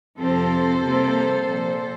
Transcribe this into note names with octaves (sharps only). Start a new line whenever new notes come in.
F2 C3 F3 C4 A4 C5
C3 G3 A#3
A#2 F3 C4